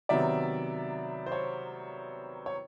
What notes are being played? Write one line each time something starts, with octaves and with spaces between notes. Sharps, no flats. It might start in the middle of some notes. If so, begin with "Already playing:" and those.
C3 D#3 F#3 B3 D5 E5
C5
C#5
C#5